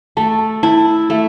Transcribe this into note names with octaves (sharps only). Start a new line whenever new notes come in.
A3 A5
E4 A5
A3 E5